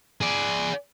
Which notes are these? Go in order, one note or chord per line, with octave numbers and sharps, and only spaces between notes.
G#4 D5